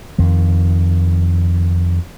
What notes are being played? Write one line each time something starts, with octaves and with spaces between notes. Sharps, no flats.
F2 D#3